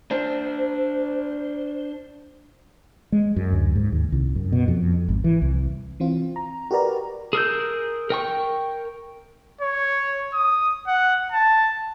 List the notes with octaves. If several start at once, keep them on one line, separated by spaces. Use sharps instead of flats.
D4 C5
G#3
F#2
D2
G#2
D#2
C2
F#2
B2
F2
G#1
E3
C2
E3 C4 F4
A#5
F#4 G4 A#4 B4 D5 A#5
G#4 A#4 E6 G6
A#4 G5 C#6
C#5
D#6
F#5
A5